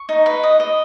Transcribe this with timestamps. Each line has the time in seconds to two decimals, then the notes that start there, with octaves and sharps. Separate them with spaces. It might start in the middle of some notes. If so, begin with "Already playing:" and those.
Already playing: C#6
0.09 D#4
0.26 B4
0.43 D#5
0.60 D#5